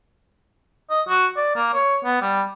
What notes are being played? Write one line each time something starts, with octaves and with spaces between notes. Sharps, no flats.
D#5
F#4
D5
A#3
C#5
B3
G3